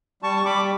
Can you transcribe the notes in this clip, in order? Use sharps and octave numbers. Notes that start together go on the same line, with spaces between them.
G3 A5 C#6
C#6
G3 B5 D6